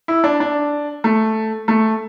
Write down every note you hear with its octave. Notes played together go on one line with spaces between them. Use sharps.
E4
D4
D4
A3
A3